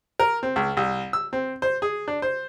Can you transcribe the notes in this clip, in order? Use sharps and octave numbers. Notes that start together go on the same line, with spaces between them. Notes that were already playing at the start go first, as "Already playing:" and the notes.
A#4
C4
C#2
C2
E6
C4
C5
G#4
D4
C5